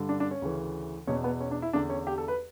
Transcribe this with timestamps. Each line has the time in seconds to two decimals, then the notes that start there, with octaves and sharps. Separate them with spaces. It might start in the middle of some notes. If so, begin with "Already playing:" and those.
Already playing: G2 D3
0.09 D4
0.20 D4
0.31 C#4
0.42 D2 C#3 E3
1.07 E2 B2 C#4
1.24 B3
1.40 C#4
1.51 D4
1.62 E4
1.73 E2 D3 D4
1.90 C#4
2.07 G4
2.18 A4
2.28 B4